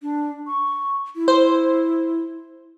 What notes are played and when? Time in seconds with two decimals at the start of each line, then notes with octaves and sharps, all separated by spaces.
0.02 D4
0.47 C#6
1.15 E4
1.28 C5